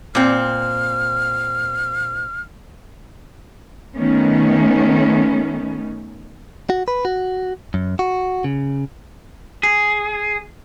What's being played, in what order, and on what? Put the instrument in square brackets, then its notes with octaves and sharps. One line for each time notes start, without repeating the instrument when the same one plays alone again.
[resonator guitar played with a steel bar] A#2 C4 [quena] F6
[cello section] D#3 A3 B3 C#4
[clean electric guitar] F#4
B4
F#4
F#2
F#4
C#3
[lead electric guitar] G#4